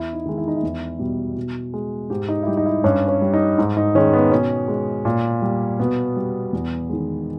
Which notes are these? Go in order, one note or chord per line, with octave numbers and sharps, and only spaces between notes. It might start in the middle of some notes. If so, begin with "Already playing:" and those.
Already playing: E2 E4
D#4
D#3 G#3
E4
D#4
E4
E2
B2 G3
B2
G#3
G#2 G4
D#4
E4
G3 G4
D#4
E4
G2 C#4
C#4
G3
D#4
G#2
D#4
D#3 G#3 C#4
B3
B2 C#4
G#3
A#2
G3
B2 B3
G3
E2
D#3 G#3